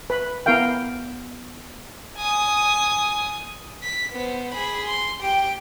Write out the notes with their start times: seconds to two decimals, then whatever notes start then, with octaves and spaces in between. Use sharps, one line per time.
0.10 B4 B5
0.46 B3 E4 A#4 F5 G5
2.17 G#5 D#6
3.82 B6
4.12 B3 C5
4.54 G#4 B5
4.86 C6
5.20 G4 G5